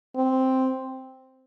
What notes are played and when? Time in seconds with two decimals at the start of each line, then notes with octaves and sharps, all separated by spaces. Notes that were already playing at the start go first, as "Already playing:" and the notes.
0.16 C4